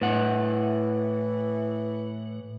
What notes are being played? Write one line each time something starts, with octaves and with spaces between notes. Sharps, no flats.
A2 E3 F#5